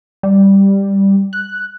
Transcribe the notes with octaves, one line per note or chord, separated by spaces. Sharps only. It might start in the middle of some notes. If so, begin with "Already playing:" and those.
G3
F#6